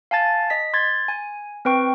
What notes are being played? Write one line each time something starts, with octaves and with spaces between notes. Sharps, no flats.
F5 G#5 A5 A6
D#5 B6
C6 G#6 A6
G#5
C4 B4 G5 C#6